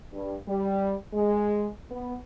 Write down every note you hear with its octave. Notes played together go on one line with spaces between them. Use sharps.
G2
G3
G#3
B3